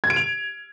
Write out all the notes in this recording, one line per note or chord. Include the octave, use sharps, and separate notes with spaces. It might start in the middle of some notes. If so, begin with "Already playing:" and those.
G#6
D7
F7